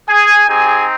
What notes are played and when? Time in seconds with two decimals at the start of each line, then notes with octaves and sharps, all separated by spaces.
0.09 G#4 G#5
0.48 C4 D#4 G4 G#4 G#5